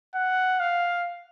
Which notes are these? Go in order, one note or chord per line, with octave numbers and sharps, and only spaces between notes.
F#5
F5